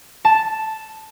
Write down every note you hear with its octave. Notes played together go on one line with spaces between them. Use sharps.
A5